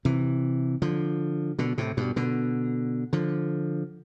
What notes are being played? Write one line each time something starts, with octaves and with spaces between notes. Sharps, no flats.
C3 E3
D3 F3
B2 D3
A2 C3
G2 B2
B2 D3
D3 F3